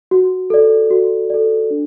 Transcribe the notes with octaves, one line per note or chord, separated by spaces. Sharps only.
F#4
A4 D5
F#4
A4 D5
D4